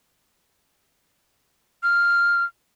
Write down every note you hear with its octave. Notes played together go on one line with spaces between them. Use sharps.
F6